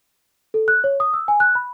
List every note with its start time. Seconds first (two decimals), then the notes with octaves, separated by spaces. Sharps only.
0.54 A4
0.68 F#6
0.84 C#5
1.00 D#6
1.14 E6
1.28 G#5
1.40 F#6
1.55 B5